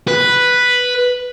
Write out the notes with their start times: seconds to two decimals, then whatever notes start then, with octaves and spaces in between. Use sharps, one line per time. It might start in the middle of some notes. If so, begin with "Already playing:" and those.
0.08 B4